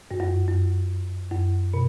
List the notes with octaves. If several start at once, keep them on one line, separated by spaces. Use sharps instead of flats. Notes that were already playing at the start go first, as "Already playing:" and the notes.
G2
F#2
F#2
F#2
B2